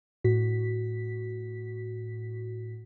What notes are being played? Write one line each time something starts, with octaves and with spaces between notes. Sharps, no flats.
A2 F#4 B6